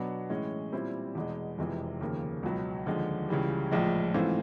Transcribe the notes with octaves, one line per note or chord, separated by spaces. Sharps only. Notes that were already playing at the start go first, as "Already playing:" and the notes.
Already playing: B2 F#3 B3 D4
A2 E3 G#3 C#4
A#2 G3 C4 E4
E2 B2 G#3
F1 F2 C3 E3 G#3
D#2 C#3 F3 A#3
C#2 B2 F#3
D#2 D3 F3 G#3
C#2 C#3 E3 G3
A#1 A2 F3 G#3
G#2 E3 A3 C4 F4